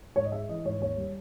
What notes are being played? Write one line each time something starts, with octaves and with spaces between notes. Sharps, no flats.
G#2 C#5
D#5
G#3 E5
E3 D#5
G#2 C#5
D#2 C#5
G3